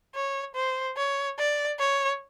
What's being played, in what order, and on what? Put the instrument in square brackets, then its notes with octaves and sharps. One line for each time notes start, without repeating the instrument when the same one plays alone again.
[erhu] C#5
C5
C#5
D5
C#5